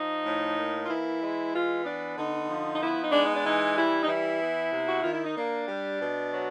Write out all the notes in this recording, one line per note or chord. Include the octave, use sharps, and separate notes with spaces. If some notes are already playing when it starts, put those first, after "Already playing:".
Already playing: F3 D#4
A2
A#3
F4
E3 E4
G#3
E3 F4
B3 D4
D3 D#4
F3
D#4
B3 E4
D#4
G#3 D4
D#4
D4
E3 D#4
G3 E4
D#4
E3 E4
B3
C3
F#4
D#3 F4
E4
D#4
A#3 D4
G3
B2
F#3